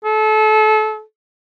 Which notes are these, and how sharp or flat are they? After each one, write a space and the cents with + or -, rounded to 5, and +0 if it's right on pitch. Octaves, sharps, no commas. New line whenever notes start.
A4 -30